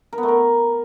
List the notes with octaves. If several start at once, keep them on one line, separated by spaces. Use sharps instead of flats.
A#4
B3
A3
A#4